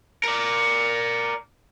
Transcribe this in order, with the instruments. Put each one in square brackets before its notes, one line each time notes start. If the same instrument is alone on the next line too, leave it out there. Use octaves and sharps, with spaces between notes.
[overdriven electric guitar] A#4 D5